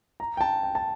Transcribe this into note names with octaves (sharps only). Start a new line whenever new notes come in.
A#5
G5
A5
G5
A5